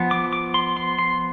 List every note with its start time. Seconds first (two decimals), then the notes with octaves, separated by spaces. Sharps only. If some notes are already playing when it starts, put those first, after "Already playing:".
Already playing: F3 B3
0.11 D6
0.33 D6
0.54 C6
0.77 C6
0.99 C6